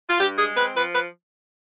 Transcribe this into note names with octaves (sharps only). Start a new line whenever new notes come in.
F4
G2 G4
G#3 G#4
C4 B4
F3 B4
B4